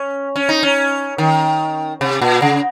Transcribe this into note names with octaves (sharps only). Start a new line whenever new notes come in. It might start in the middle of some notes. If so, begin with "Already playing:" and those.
Already playing: C#4
C#4
D#4
C#4
D#3
C3
A#2
C#3